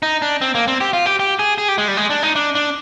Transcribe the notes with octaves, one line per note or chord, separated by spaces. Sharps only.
D#4
D4
C4
A#3
C4
G4
F4
G4
G4
G#4
G#4
G4
G#3
G3
G#3
D4
D#4
D4
D4